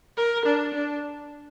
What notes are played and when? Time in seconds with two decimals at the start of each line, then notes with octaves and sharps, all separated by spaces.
0.17 A#4
0.46 D4
0.74 D4